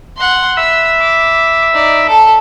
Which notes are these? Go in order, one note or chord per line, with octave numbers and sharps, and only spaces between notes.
F#5 C6
E5 B5 E6
D6
D#4 D5
A4 A5